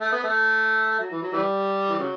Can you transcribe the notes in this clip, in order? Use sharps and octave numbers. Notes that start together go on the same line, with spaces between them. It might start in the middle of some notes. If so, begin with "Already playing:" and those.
A3
B3
A3
F#3
E3
F#3
E3 G3
E3
C#3 F#3